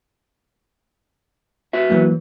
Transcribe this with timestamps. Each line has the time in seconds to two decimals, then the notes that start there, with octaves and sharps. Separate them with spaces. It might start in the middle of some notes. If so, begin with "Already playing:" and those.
1.73 B3 F#4 E5
1.90 E3 F#3 A#3